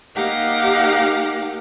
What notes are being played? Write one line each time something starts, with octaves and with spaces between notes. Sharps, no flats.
A#3 D#4 G4 F5 F#5